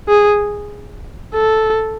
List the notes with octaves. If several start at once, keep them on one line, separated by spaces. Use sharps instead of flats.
G#4
A4